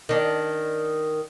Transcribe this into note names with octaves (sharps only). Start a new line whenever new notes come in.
D#3 D4